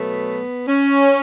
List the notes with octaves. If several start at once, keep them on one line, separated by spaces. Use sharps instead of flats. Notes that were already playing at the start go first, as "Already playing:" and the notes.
Already playing: B2 F#3 A3 B3
C#4